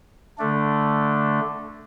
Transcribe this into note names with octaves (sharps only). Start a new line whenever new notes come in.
D3 A3 D4